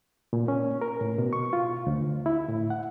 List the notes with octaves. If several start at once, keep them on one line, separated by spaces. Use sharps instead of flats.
A#2
C#4
A#4
A2
B2
C#6
F4
D2
E4
A2
F#5